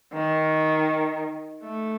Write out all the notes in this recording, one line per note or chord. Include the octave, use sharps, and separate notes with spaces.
D#3
A3